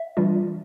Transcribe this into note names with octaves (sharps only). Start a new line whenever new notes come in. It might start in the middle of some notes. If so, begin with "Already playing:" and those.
Already playing: E5
E3 G3 D4 F4